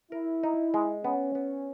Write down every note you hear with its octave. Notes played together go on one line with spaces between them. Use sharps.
E4 A#4
D#4
G#3
B3 C#4
B3